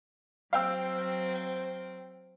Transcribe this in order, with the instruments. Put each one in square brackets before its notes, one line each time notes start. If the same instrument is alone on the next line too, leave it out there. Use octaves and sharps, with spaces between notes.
[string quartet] F#3 C4 [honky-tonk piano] F5 G5 E6